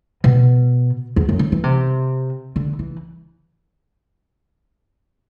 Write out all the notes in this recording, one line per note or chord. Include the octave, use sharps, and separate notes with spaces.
B2
E2
F#2
D3
E3
C3
D3
E3